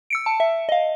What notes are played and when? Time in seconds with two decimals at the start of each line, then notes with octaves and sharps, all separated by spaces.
0.10 E6 C#7 D7
0.26 A5
0.40 E5
0.69 D#5 F5